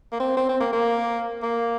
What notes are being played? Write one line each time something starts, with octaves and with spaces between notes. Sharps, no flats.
A#3
C4
C4
C4
A#3
A#3
A#3